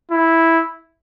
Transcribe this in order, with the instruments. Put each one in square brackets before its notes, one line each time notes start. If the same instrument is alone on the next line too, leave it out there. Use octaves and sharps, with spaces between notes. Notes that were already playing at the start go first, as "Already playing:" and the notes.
[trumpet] E4